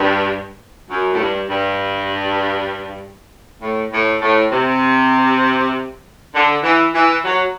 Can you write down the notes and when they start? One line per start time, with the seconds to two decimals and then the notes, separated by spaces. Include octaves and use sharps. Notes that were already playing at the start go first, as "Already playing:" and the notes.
Already playing: G2
0.89 F#2
1.13 A2
1.19 G2
1.49 G2
3.61 A2
3.92 A2
4.21 A2
4.51 C3
6.34 D3
6.63 E3
6.94 E3
7.24 F#3